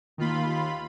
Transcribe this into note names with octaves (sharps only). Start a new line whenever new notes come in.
D#2 D#3 A#3 F4 B5